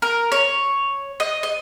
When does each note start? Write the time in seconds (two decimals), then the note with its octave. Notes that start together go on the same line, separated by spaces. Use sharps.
0.02 A#4
0.32 C#5
1.20 D#5
1.43 D#5